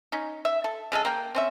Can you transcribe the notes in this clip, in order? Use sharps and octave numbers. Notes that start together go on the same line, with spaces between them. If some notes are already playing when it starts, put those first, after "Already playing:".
C#4 D#4
E5
A4
C#3 G#3 G#4 A4
A#3 A#4 G5
C4 C#4 E5